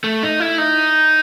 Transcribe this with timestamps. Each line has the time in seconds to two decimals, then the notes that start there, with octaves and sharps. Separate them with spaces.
0.04 A3
0.23 D#4
0.40 E4
0.58 D#4